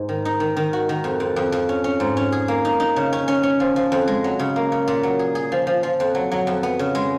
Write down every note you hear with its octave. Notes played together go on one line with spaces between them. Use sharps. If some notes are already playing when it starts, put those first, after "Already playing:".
Already playing: G#2 G#3
D#3
D#4
D#3
D#3
F#4
D#3
F2
F2
F2
F2
C#4
C#4
G#2
C#4
G#4
A#3
D#4
D#4
C#3
C#4
C#4
C#4
F3
F3
F2
G#3
F#3
C#3
A#3
C#3
A#2
F#3
G#4
G#4
F3
F3
F3
F2
F#3
F#3
F2
B3
C#3
G#3